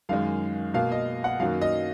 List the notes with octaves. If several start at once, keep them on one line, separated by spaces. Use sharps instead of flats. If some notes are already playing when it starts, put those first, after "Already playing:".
F#2 D#3 G#3 F5
B2 A#3 F5
D#5
F#5
F#2 D#3 F#3 A#3 F5
D#5